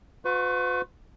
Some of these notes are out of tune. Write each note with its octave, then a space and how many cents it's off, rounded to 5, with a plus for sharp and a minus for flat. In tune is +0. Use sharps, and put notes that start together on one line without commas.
F#4 -45 B4 +40 C#6 +0